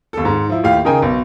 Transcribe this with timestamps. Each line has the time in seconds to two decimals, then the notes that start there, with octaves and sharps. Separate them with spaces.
0.13 D#2 A4
0.25 G#2
0.49 F3 E4
0.63 D#2 A2 G4 F5
0.85 C#3 D#4 A#4 G5 G#5
1.02 B1